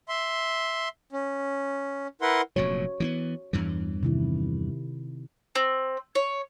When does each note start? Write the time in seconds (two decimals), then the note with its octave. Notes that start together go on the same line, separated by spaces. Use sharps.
0.09 E5 C6
1.12 C#4
2.22 E4 A#4 B4 F#5 C6
2.56 F1 A#2 F#3 F#4 C#5
3.00 E3 A#3 B3
3.53 E2 G2 E3
4.03 C3 D#3 E4
5.55 C4
6.15 C#5